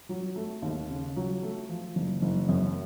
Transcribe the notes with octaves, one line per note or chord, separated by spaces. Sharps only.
F#3
A3
D#2
C#3
F#3
A3
F3
F#1
F#1
F#2